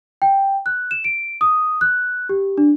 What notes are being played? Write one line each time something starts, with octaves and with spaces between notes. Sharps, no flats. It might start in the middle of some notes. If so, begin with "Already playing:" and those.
G5
F#6
E7
D7
D#6
F#6
G4
D4